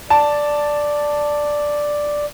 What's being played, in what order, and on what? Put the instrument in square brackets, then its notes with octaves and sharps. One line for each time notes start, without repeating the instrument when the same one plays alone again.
[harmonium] D5 [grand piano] A5